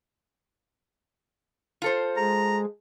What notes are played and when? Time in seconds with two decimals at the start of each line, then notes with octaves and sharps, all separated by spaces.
1.82 F4 A4 C5
2.17 G#3 A#5